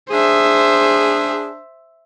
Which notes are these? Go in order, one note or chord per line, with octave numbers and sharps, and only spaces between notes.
D4 G#4 C5 E5